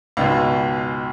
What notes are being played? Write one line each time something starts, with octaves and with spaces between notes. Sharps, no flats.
C#2 G#2 B2